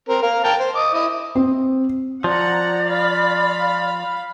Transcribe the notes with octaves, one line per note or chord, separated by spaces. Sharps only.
C4 A#4
A#4 F5
A#4 G5 A5
C5
D#5 D6
E4 D#5
C4
F3 D5 F#5 A#5
F5 B5